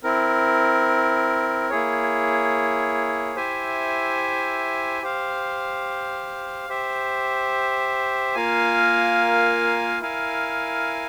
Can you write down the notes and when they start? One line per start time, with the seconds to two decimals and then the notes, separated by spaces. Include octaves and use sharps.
0.03 C4 E4 A#4
1.69 A#3 E4 G#4 C#5
3.36 E4 G4 C5 E5 G#5
5.02 G4 C5 F5
6.69 G4 C5 E5
8.34 A#3 F4 A#4 F5 G#5
10.01 E4 A#4 F5 G#5